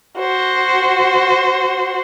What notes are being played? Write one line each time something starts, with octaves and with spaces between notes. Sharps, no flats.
F#4 C5